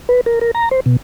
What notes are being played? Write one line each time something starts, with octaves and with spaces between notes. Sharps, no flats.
B4
A#4
A#4
A#5
C5
B2